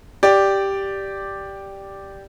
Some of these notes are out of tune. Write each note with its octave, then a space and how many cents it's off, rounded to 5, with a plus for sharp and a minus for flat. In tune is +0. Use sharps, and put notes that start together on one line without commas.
G4 +0 D5 +0